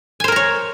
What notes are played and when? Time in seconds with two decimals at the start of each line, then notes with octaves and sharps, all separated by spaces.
0.20 G#5
0.24 C5
0.28 A#4
0.32 A#5
0.36 C#5